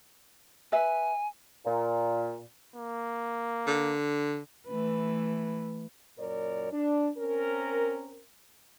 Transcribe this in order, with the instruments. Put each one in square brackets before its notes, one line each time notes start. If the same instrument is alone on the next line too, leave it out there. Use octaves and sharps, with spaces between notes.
[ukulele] B4 E5 [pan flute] G#5
[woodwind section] A#2
[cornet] A#3
[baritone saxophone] D3
[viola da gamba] E3 A3 B4
[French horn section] F#2 A#2 A#4 C#5 D5
D4
C4 C#4 A#4